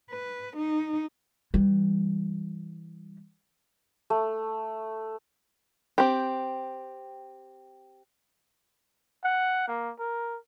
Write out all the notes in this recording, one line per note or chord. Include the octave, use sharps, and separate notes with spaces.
B4
D#4
E3 G3
A3
C4 G4
F#5
A#3
A#4